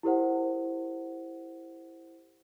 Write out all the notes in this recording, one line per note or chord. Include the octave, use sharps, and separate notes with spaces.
E4 G4 A#4 C5 F#5